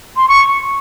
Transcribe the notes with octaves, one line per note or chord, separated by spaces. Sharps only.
C6
C#6